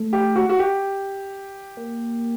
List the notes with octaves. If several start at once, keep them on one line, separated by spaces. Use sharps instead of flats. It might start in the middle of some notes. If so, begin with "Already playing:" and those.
Already playing: A3
G4
F#4
F#4
G4
A#3